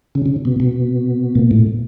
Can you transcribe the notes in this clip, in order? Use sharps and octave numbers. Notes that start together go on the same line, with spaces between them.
C#3
C#3
B2
B2
A#2
A2